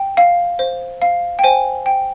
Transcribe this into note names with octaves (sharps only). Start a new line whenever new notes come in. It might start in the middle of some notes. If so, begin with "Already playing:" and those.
Already playing: G5
F5
C5
F5
G5
C5 G#5
G5